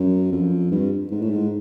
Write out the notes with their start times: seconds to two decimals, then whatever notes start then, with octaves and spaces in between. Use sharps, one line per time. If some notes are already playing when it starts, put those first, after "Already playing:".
Already playing: F#2
0.32 F2
0.71 G2
1.11 G#2
1.22 A2
1.30 G#2